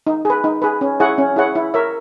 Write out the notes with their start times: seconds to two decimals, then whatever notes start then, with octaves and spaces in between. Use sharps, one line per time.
0.07 D#4
0.25 G#4 B4
0.44 D#4
0.62 G#4 B4
0.81 C#4
1.00 E4 G#4 C#5 F#5
1.18 C#4
1.36 E4 G#4 C#5 F#5
1.55 E4
1.74 A#4 C#5 E5